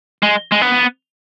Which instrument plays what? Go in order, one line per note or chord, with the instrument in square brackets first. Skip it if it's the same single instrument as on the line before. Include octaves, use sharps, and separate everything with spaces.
[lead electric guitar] G#3
G#3
B3